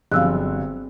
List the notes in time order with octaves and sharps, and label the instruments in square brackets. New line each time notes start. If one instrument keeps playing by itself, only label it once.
[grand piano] G1 [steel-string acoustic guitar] F3 F#3 [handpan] C4 G#4 [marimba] F5 E6 F#6